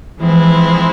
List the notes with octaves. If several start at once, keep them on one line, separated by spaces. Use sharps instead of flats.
E3 F3 G#3 C4 E4